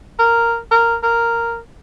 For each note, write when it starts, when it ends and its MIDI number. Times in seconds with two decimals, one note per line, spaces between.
0.19 0.57 70
0.71 0.96 70
1.03 1.58 70